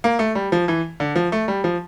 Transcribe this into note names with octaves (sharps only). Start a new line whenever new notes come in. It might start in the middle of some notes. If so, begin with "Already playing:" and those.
A#3
A3
G3
F3
E3
D3
F3
A3
G3
F3